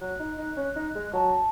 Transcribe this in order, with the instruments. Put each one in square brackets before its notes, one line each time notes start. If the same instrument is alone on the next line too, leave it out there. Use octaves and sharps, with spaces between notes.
[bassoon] F#3 [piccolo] F#6
[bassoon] D#4
D#4
C#4
D#4
G#3
[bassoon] F#3 [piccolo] A5